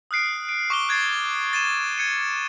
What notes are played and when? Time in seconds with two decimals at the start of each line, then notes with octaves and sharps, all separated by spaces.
0.11 D#6 F6 F#6 C7 D7
0.49 D7
0.70 C#6 D6 C7 G7
0.89 F#6 G#6 A6 C7
1.53 A6 D#7 E7
1.98 G#6 C#7 D#7